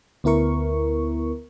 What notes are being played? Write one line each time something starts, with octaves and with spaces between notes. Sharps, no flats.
D2 B3 E4 A#4 C#6